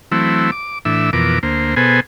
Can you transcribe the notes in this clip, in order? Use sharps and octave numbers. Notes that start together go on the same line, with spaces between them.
E3 F#3 A3 C4 E4
D6
A2 E3 D4 E5
F2 B2 E3 A#4 D6
D2 A#3 C5
B2 B3 G#4 A4 C5 G#5